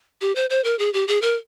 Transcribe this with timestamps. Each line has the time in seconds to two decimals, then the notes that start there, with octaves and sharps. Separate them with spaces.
0.21 G4
0.36 C5
0.50 C5
0.64 A#4
0.79 G#4
0.93 G4
1.08 G#4
1.22 A#4